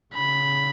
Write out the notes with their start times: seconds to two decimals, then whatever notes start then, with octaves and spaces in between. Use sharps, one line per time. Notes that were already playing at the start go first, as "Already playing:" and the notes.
0.14 C#3 B5